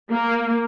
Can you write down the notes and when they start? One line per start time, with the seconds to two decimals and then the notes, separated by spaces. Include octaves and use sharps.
0.12 A#3